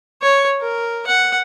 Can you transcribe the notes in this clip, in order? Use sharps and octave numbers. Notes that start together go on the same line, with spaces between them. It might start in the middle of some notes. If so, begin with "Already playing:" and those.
C#5
A#4
F#5